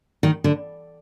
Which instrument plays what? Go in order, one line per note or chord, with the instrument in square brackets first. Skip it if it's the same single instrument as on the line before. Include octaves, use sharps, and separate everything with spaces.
[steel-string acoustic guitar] D#3
D3